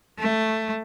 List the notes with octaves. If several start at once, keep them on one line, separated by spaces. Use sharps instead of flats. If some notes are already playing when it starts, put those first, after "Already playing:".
A3